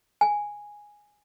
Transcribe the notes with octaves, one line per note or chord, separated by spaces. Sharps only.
G#5